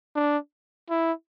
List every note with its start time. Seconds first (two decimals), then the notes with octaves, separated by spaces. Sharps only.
0.15 D4
0.90 E4